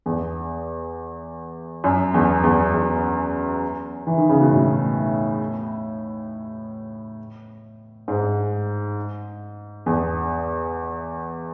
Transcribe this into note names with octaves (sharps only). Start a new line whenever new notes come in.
E2
F#2
E2
E2
E2
E3
D#3
C#3
B2
A2
G#2
E2